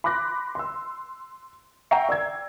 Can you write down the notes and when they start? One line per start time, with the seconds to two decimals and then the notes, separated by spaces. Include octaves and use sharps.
0.04 B5 C6 D6 F#6 A#6
0.55 C6 E6
1.91 E5 F#5 G5 A#5 C#6 C7
2.09 D5 E6 G#6